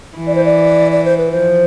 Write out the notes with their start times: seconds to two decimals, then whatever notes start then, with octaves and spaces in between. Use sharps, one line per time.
0.17 E3
0.27 D5
0.35 C5
0.45 D5
0.92 D5
1.05 C5
1.18 B4
1.31 F3 C5